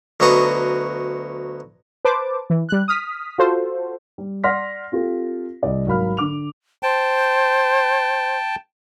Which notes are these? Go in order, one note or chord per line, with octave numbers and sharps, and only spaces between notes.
D2 F#3 B3 D#4 C#6 D#6
B4 C5 A5 D6
E3
G3 F#6
D#6 F6 B6
F4 F#4 A4 C5
G3
D5 F#5 C6 F6 A#6 B6
C4 F4 G4 A4
C2 G3 D5 D#5
G#1 F#3 A#4 F5 B5 F6
D3 D6 F7
C5 G5 A5